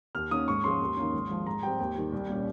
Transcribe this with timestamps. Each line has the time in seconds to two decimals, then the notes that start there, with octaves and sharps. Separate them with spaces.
0.15 D#2 F6
0.31 D#3 A#3 C#4 D#6
0.48 G#2 C#6
0.64 F3 G#3 C#4 C6
0.81 D#2
0.97 D#3 A#3 C#4
1.13 G#1
1.29 G#2 F3
1.47 G#2 A#5
1.63 G3 C4 G5
1.79 D#2 G5
1.96 D#3 G3
2.13 C2
2.29 A#2 G3 C#4